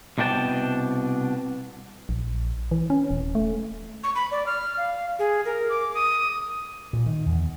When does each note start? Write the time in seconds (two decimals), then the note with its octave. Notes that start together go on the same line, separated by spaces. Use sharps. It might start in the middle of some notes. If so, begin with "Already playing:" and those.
0.18 C2 B2 D4 G5 A5
2.09 A#1
2.71 E3
2.90 C#4
3.11 D#1
3.35 A3
4.03 C#6
4.15 B5
4.31 D5
4.47 F6
4.77 F5
5.19 G#4
5.45 A#4
5.69 D6
5.94 D#6
6.93 A#2
7.06 D#3
7.26 E2